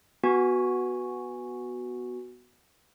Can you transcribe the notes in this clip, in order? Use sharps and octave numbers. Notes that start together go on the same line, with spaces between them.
B3 F#4 G#5